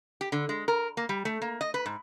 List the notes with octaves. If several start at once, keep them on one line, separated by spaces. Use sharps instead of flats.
G4
D3
G#3
A#4
A#3
G3
A3
A#3
D#5
B4
G#2